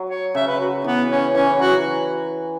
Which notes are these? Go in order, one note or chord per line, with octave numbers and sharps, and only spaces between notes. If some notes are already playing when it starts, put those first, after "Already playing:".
Already playing: F#3
C#5
C#3 E5
B4
F#4
E3 B3
C#4
E3 C#4
E3
F#3 F#4
E3